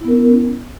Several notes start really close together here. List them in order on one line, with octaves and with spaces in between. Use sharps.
E4 B3 A#4 C#4